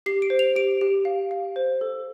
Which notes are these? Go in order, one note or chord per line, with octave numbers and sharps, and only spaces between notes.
G4 C7
D7
C5
F7
G4 D7
G4
F5
F5
C5
A4